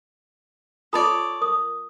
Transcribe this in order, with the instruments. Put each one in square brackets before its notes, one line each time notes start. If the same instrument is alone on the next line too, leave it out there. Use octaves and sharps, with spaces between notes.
[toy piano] F4 D#6 [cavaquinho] A4 C#5 D5
[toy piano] A#4 D#6